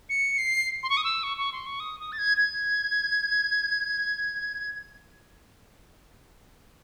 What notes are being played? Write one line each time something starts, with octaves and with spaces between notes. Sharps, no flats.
C#7
C7
C6
C#6
D#6
E6
C#6
C#6
C6
C#6
D#6
D#6
A6
G#6
G#6